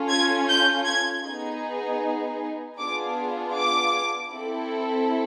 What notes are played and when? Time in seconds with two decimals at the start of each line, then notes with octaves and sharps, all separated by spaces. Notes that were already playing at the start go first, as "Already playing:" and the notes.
Already playing: C#4 F4 A4
0.09 G#6
0.48 G6
0.86 G#6
1.24 B3 D#4 G#4
2.78 B3 D4 F4 G#4 D6
3.56 D6
4.33 C4 E4 A4